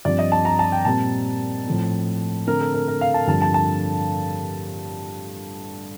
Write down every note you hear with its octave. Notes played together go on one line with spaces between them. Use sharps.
G2 F3 C4 D5
D#5
A5
A#5
A5
G5
A#2 G3 C4 A5
A2 F3 A3 C4
D3 A3 C4 A#4
A4
A#4
A#4
F5
A5
G2 D3 F3 A3 C4 A5
A5
A5